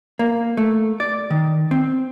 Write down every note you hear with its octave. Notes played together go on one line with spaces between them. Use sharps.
A#3
A3
D5
D#3
C4